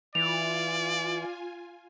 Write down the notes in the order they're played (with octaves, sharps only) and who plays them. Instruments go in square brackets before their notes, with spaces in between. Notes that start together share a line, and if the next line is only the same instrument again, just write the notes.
[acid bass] E3 [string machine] F4 G#5 [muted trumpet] D5 [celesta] F7